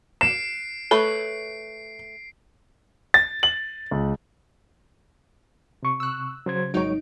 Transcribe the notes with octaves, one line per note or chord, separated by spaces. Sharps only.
C7 D7 E7
A3 A4 B4 C#5 C7
A6
F#7
C#2
C3 C#6
E6 F#6
C#3 F#3 C5 G#6
G#1 F#3 G#3 D#4 C#5 D7